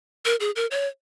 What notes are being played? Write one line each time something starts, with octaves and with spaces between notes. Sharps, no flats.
A#4
G#4
A#4
C#5